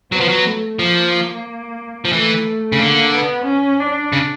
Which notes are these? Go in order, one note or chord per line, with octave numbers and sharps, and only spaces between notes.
F#3 B3
F3
F#3
A3
F3 A#3
F3
E3 A3
C#3
D3 A#3
B3
C#4
D4
C#3